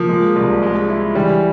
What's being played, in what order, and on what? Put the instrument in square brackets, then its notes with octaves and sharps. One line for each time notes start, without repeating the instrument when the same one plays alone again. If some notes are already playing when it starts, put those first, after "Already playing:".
Already playing: [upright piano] F3 [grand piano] A#3
[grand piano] G#3
C2
G#3
E4
[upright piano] E3 [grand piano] G3